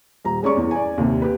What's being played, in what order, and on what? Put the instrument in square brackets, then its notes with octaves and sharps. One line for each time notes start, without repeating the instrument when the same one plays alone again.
[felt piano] D#1 A#5
G#3 C#4 D5 C#6
E2
D5 G#5
D#2 C3
G4 B4